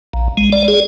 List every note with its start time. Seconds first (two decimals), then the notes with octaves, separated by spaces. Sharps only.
0.13 A#1
0.37 G#3
0.52 D5
0.68 G#4